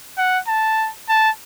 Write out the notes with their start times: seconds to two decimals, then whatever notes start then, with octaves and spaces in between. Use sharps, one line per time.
0.18 F#5
0.48 A5
1.09 A5